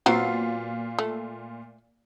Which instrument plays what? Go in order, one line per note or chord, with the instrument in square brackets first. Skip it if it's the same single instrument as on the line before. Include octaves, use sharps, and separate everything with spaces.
[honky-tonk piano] A#2 F4 C7 [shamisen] F#3 B3 C4
[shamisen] A3